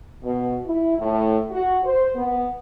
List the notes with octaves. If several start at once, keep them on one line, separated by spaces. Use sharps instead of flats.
B2
E4
A2
F#4
C5
B3